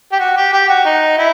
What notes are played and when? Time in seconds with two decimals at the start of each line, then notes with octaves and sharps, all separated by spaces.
0.12 G4
0.19 F#4
0.36 G4
0.53 G4
0.69 F#4
0.85 D#4
1.18 E4